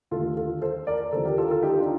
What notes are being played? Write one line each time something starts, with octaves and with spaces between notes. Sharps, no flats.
D#2 D3 A3 F4 A4
F4 A4
A4 C5
A#4 D5
D#2 D3 F3 A4 C5
G4 A#4
F4 A4
F4 A4
D#4 G4
D4 F4